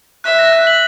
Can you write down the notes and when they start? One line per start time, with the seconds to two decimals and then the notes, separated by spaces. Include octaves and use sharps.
0.24 E5 F#6
0.39 A#6
0.53 F#6
0.67 F#7